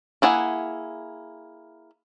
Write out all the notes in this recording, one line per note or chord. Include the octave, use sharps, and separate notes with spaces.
A#3 E4 G#4 F#5